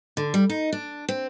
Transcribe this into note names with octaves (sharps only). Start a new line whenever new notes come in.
D3
G3
D#4
D4
C4